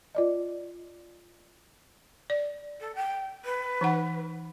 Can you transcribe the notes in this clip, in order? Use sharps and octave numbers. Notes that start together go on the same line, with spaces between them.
F4 D5 D#5
D5
A4
G5
B4
E3 D#4 F#5